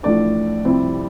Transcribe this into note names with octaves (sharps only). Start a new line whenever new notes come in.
A1 A2 F3 A3 D4 D5
F2 C3 G3 C4 E4